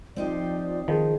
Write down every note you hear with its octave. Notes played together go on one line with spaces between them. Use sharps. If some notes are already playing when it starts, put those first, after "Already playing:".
F3 C4 D#4 G4 D5
D#3 F3 G#4